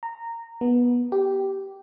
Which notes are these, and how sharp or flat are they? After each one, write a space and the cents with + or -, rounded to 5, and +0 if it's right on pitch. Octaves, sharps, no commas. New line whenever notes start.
A#5 -15
B3 -20
G4 -10